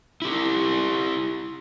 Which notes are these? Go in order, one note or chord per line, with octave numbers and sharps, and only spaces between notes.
E4 G4